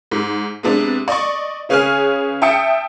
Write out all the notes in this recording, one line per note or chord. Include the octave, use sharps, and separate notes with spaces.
G#2
C3 G#3 B3 D4
D5 D#5 C#6
C#3 C#4 G#4 B4 G#5 F6
E5 G5 A5 D#6 C#7